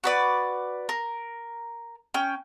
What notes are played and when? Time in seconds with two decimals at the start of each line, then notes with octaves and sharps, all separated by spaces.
0.04 F#4 B4 D5
0.89 A#4
2.14 C#4 G5